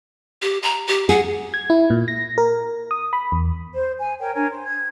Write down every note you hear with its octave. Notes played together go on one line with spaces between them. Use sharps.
G4
A#5
G4
G#4 F#5
G#6
E4
A#2
A#6
A#4
D#6
B5
E2
C5
G#5
A#4 C#5 G5
D4 A#4 C#5 G#5
C5
G#6